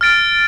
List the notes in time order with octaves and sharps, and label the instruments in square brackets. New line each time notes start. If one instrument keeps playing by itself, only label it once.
[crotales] F6 A6 D7